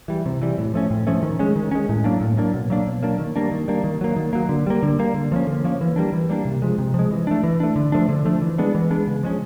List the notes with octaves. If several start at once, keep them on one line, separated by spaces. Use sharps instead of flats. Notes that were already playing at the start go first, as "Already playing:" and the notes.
E3 G3
C3
E3 G3
A2
F3 A3 C#4
A2
F3 A3 C#4
D#3
G#3 C#4
D#3
G#3 C#4
A2
F#3 A#3 D4
A2
F#3 A#3 D4
B2
F#3 A#3 D4
B2
F#3 A#3 D4
D#3
G3 A#3 D4
D#3
G3 A#3 D4
D#3
F#3 A#3
D#3
F#3 A#3
D3
G3 A#3
D3
G3 A#3
D3
F3 A#3 C#4
D3
F3 A#3 C#4
E3
G3 A#3 D4
E3
G3 A#3 D4
C3
F3 G#3
C3
F3 G#3
E3
A3 D4
E3
A3 D4
D3
F3 A3 D4
D3
F3 A3 D4
E3
G#3 B3 D4
E3
G#3 B3 D4
C#3
F3 G#3 C#4